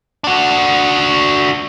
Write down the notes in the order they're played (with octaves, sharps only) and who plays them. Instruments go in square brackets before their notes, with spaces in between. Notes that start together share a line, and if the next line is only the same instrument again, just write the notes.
[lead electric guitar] D4 F#4